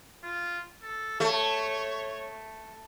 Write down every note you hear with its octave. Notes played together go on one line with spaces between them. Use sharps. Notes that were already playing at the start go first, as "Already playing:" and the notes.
F4
A4
A3 C#5